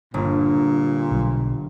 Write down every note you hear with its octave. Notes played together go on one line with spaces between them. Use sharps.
G1 A#2
B1